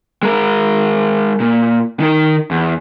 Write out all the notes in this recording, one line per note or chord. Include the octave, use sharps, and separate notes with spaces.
G#3 A#4
A#2
D#3 A#4
E2